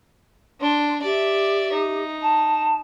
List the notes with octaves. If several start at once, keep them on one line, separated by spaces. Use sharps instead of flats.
D4 C6
G4 D5 E5
D#4
A5